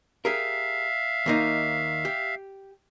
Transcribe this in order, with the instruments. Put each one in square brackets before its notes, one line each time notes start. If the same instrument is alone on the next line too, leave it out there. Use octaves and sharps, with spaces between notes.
[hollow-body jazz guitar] G4 G#4 A#4 [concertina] E5 F5
[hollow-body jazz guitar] D#2 A#3 D#4
G4